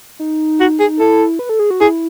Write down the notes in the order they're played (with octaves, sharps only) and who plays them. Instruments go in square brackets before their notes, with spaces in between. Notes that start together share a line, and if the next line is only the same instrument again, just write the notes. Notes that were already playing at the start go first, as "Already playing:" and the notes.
[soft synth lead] D#4
[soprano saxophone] F#4
G#4
[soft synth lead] E4 [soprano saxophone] A4
[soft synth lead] B4
A4
G#4
F#4
[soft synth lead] E4 [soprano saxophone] G#4